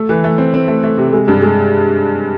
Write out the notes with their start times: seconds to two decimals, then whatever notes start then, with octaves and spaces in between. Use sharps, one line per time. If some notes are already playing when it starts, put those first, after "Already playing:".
Already playing: A3
0.09 E3
0.24 A3
0.38 C4
0.54 C4
0.68 A3
0.83 A3
0.97 C3
1.13 G#3
1.28 G2
1.42 G#3